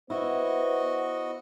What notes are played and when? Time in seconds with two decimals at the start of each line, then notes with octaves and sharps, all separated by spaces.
0.10 B3 E4 F#4 C5 D#5